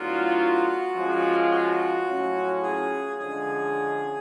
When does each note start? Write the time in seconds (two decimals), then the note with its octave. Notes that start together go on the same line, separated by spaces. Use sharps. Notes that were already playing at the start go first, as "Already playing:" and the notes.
Already playing: A2 F#3 B3 D4 F4 F#4
0.96 F3 G#3 C#4 F4
1.51 F#4
2.07 A2 F#3 C#4 F4
2.63 G#4
3.19 D3 F3 G#3 C#4 G#4